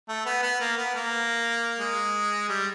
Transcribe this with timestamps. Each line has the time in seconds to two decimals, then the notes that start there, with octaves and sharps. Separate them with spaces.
0.09 A3
0.26 B3
0.43 B3
0.60 A#3
0.77 B3
0.95 A#3
1.80 G#3
2.49 G3